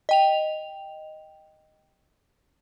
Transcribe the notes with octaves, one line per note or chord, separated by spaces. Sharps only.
D#5 G5 F7